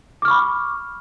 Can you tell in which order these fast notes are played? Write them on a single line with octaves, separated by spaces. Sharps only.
D6 F6 C#6 B5